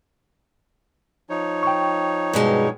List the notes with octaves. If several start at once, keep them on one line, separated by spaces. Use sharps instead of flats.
F3 D#4 C#5
G5 C#6
G2 B2 G#3